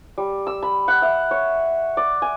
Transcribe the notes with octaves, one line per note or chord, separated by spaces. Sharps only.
G3
E6
B5
F#5
E5
C#5
D5
G#5